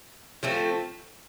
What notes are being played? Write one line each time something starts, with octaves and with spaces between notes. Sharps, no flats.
F3 A3 C4